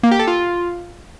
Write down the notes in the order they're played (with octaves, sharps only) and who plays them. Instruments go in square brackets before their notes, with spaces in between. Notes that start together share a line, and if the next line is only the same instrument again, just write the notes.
[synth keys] A#3
G4
A4
F4